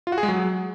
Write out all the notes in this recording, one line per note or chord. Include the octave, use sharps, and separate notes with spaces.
F4
F#4
G#4
G#3
F#3